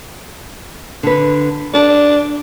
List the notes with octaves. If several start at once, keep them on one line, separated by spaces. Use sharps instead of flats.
D3 B4
D4 A4